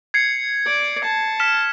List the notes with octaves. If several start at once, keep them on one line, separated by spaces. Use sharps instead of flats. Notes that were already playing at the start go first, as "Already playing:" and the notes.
G#6 C7 C#7
D5
A5
F6 B6 E7